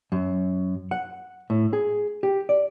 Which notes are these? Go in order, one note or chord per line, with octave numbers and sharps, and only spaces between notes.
F#2
F#5
A2
G#4
G4
D5